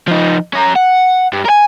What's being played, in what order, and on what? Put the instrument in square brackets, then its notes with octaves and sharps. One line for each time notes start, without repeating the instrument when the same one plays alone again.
[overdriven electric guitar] F3 D#4
C#4 A#5
F#5
G2
A#4 G#5